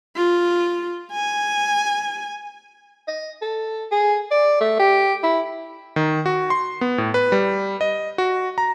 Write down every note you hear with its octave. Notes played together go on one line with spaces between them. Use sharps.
F4
G#5
D#5
A4
G#4
D5
A3
G4
E4
D#3
F#4
C6
B3
A2
B4
G3
D#5
F#4
A#5